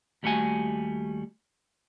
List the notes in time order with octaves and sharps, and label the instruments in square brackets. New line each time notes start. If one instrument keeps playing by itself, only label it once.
[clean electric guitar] D#2 G3 A3 F#4 G#5